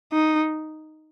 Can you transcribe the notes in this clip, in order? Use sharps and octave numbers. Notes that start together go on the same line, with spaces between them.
D#4